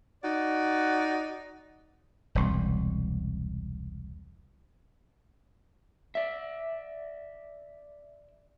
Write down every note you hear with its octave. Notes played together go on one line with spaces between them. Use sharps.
D#4 F#4 D5
E1 C2
D5 E5